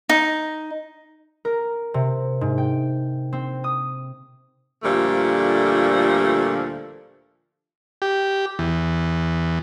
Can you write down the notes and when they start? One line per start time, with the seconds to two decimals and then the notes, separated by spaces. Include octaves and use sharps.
0.09 D#4
1.45 A#4
1.94 C3
2.41 G#2
2.58 G5
3.33 C4
3.64 D#6
4.83 D2 A#2 D3 F3 G3 A3
8.02 G4
8.59 E2